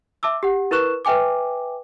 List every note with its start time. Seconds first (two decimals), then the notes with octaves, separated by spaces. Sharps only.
0.23 E5 A5 D6 E6
0.43 G4 F#5
0.71 E4 A#4 B4 C#6 F#6 E7
1.05 B4 E5 G5 G#5 D6